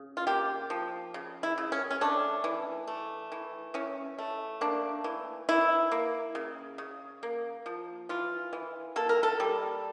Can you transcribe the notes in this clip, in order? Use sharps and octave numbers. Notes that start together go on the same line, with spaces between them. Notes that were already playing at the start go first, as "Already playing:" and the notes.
Already playing: C#3
F4
A#3 G4
F3
C#3
E4
C#3
C#4
C#4
A3 D4
E3
A3
E3
E3 C#4
A3
A#3 D4
E3
E3 E4
A#3
C#3
C#3
A#3
F3
E3 F4
E3
A#3 A4
A#4
A4
G3